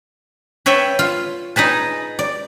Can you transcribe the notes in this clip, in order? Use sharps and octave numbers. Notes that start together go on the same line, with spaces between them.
B4 C#5 E5 G5 A5
F4
D#4 G#4 B4 A5
D5